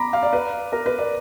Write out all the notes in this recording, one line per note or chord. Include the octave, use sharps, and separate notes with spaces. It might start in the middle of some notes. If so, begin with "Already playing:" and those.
Already playing: A#5 B5 D6
F5
D5
B4
A#4
B4
D5